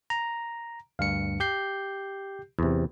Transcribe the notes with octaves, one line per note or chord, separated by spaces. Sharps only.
A#5
D2 G2 F5 C#7
G4 G6 C7
E2 C3